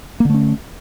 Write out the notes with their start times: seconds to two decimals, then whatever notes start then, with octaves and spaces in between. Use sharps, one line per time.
0.20 A#3
0.25 D3
0.30 A3
0.34 C#4